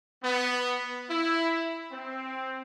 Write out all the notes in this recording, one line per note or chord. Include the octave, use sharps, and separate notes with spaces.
B3
E4
C4